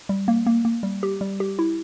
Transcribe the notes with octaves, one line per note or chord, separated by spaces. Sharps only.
G3
A#3
A#3
A#3
G3
G4
G3
G4
E4